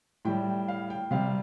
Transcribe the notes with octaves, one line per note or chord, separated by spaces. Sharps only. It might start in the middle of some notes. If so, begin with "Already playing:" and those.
A2 G3 G5
F5
G5
C3 G3 F5